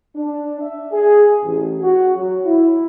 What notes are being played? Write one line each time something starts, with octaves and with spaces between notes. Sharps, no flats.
D4
E5
G#4
A1
F#4
F#3
E4